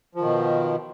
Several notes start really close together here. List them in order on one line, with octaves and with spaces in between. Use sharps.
F3 D#3 B2